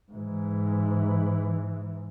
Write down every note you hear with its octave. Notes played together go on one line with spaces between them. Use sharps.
G#2 E3